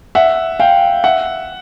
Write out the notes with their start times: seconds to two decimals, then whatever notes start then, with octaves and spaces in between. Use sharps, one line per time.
0.15 E5 F#5
0.59 F5 G5
1.04 E5 F#5